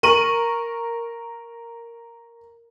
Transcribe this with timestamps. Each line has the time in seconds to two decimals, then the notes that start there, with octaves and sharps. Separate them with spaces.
0.03 A#4 C#6 D#7 F#7